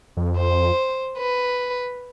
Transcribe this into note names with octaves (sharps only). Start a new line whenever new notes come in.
F2
C5
B4